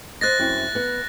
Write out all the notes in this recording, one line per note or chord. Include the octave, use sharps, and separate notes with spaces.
C5 D#5 F#6 A6 A#6
F#2 C4 E4
B3 B4